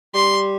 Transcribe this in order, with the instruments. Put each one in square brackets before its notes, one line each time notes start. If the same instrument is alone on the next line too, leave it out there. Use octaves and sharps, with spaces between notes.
[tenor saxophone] G3 [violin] C6